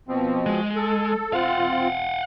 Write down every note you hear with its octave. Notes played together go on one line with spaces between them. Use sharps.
B2 F3 C4
G#3
A4
C4 F4 F5 F#5